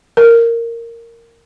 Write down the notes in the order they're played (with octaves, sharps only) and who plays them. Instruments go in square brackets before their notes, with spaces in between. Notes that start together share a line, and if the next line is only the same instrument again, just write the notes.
[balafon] A#4